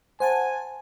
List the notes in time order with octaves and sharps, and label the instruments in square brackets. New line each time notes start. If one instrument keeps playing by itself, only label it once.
[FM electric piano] C5 F#5 A5 [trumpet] G#5